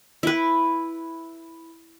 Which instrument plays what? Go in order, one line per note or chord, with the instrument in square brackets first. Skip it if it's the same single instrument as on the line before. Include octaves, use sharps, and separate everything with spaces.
[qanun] E4 B4